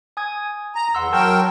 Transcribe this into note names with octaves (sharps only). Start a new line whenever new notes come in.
G#5 D#6 G#6
A#5
E2 F#5 C6 E6
F#3 A#4 G5 A5 C#6 G6